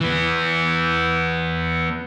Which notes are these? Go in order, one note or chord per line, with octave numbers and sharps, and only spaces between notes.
E3 B3